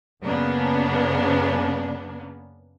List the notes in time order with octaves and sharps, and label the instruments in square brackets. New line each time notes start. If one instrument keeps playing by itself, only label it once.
[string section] F#2 C#3 A#3 B3 D4